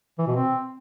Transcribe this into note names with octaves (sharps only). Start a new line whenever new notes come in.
E3
B2
C4